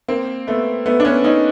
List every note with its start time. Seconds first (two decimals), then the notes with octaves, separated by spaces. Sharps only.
0.08 A#3 C4
0.47 A3 B3
0.86 A3 B3
1.00 D4
1.05 B3 C#4
1.24 C#4 D#4